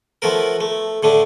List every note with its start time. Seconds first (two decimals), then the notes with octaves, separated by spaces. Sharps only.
0.22 F3 A3 B3 A#4
0.61 A3
1.03 A2 D3 A3 D4